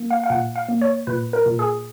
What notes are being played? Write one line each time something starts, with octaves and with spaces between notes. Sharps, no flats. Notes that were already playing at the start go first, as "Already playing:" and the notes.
Already playing: A#3
F5
F5
A#2 F#5
F5
A#3
C#5
A#2 B4
A#4
A#2
G#4